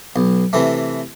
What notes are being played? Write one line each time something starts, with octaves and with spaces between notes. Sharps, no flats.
B1
C3 E3 A3